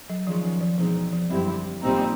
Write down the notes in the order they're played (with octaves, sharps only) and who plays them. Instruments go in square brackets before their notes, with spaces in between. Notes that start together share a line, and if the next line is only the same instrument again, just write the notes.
[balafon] F#3
[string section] D#3 G#3 C#4 F4 [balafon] F3
[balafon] F3
F3
[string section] E2 B2 G#3 C4 D#4 [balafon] F3
[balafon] F3
[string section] F#2 D3 G3 C4 E4 [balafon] F#3
[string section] A#1 A#2 G3 C4 D#4